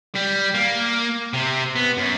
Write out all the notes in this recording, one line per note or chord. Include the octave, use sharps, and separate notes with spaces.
G3
A#3
C3
B3
F#2